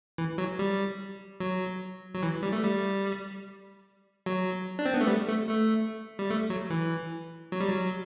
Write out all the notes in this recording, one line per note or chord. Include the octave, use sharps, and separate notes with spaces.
E3
F#3
G3
F#3
F#3
E3
G3
A3
G3
F#3
D4
C4
B3
A3
G3
A3
A3
G3
A3
F#3
E3
F#3
G3
F#3